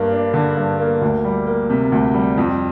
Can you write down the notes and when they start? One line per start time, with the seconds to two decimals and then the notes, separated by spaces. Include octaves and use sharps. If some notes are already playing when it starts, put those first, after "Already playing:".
Already playing: G2 A#3
0.11 D4
0.34 D3
0.57 G2
0.79 A#3
1.01 D2
1.25 G3
1.47 A#3
1.70 C3
1.92 D2
2.14 G3
2.38 F2